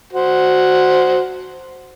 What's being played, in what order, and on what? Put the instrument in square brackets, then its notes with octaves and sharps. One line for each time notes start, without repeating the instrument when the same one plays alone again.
[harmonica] F#4 C5